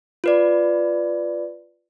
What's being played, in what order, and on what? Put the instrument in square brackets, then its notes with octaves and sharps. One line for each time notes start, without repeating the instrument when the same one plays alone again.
[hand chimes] F4 B4 D5